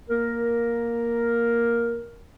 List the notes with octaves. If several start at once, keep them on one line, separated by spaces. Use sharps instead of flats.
A#3 A#4